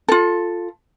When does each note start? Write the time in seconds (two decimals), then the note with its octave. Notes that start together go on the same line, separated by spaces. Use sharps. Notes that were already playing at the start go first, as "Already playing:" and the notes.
0.09 F4 A4